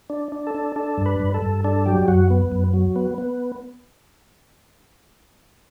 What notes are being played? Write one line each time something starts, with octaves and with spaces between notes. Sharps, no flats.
D4
D4
A4
D4
D4 A4
G2
B4
G2
A4
G2
D4 A4
F#3 G4
F#2 F#4
B3
F#2
F#3
B3
B3